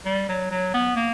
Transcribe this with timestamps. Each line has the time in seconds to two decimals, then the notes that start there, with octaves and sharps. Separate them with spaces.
0.06 G3
0.29 F#3
0.51 F#3
0.74 B3
0.96 A#3